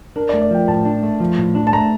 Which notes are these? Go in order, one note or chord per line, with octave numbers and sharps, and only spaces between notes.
D4 A#4
D5
A3
D5
F3 G5
A2 A5
D4
A3
F3
A2
D4
A5
A3 A#5